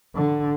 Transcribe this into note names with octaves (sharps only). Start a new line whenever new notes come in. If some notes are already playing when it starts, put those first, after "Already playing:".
D3